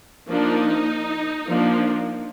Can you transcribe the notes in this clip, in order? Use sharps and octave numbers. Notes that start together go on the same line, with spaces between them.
F3 A#3 D4 D#4
F3 A#3 D4